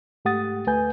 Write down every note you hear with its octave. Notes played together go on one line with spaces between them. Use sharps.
G#2 A3 G4 F#5 D#6 A6
D2 A3 B4 G#5 G6